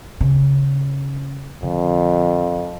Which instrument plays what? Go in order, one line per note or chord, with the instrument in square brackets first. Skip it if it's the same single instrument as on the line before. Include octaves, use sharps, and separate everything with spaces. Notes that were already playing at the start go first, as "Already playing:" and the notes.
[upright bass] C#3
[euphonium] F2 [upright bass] D3